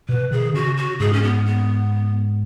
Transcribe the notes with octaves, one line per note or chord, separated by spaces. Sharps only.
B2 B4
D#3 G#4
C#3 F#4
F#4
G#2 G#4
C#4
B3
B3